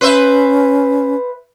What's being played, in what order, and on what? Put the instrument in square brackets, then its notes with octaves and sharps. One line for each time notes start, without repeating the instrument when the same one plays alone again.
[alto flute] C#4 [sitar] B4 C5 E5